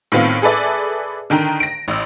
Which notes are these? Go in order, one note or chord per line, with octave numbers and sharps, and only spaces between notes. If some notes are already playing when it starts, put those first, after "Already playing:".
A2 D#3 B3 C4 F4
G#4 A4 B4 D5 E5
D3 D#3 G5 A#5
A#6 D7
A1 E6